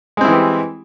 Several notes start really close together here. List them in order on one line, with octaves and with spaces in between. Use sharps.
G#3 C4 E4 E3 G4